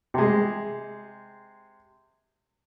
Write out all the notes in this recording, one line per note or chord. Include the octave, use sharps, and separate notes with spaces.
C3 G#3